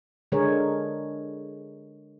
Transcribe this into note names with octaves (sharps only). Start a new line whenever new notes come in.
D3 G#3 G#4 A#4 C#5